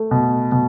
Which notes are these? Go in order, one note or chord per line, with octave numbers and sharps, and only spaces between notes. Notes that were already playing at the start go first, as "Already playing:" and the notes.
Already playing: A3
B2
B2